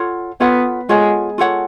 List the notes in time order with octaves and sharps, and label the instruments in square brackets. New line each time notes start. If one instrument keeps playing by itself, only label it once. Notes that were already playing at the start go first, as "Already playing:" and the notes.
Already playing: [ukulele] F4 A4 C#5 F#5
[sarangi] B3 [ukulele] F4 A4 C#5 F#5
[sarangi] G#3 [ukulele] F4 A4 C#5 F#5
[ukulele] F4 A4 C#5 F#5